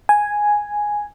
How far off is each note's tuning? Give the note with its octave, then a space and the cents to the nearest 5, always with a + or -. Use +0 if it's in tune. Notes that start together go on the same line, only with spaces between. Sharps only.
G#5 +0